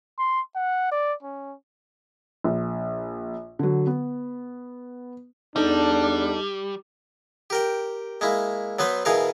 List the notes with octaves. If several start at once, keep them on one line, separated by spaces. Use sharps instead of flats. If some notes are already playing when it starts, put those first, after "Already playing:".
C6
F#5
D5
C#4
A#1
D3 F#3
B3
E2 G3 D4 D#4 A4
G4 A#4 G5
G#3 A#3 E4
F#3 B3 B4 C5
B2 E3 G#4 A#4 F5